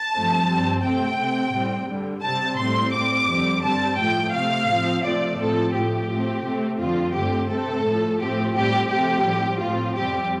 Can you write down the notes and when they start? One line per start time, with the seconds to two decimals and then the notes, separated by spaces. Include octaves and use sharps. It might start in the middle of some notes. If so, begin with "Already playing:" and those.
Already playing: A5
0.13 G2 F3 A3 C4
0.48 G2 G3 C4
0.84 C3 A3 C4 G5
1.18 C3 A3 C4
1.53 A2 G3 C4
1.88 G2 D3 G3
2.24 C3 G3 C4 A5
2.59 A2 G3 C4 C6
2.93 A2 G3 C4 D6
3.28 F2 D3 G3 C4
3.64 G2 G3 C4 A5
3.98 A2 F3 A3 G5
4.34 C3 A3 C4 F5
4.69 A2 F3 C4
5.04 C3 F3 A3 C4 D5
5.40 A2 F3 C4 A4
5.75 A2 F3 A3 G4
6.10 A2 A3 C4
6.45 C3 A3 C4
6.79 F2 D3 F3 C4 F4
7.15 G2 D3 A3 C4 G4
7.50 C3 A3 C4 A4
7.85 A2 F3 A3
8.20 A2 F3 A3 C4 G4
8.55 A2 G3 C4 G4
8.90 C3 F3 A3 C4 G4
9.25 A2 G3 C4
9.60 A2 F3 C4 F4
9.96 F2 C3 G3 C4 G4